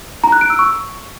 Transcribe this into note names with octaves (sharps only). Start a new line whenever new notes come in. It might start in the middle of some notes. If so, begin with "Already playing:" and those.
A#5
F#6
D7
E6
C#6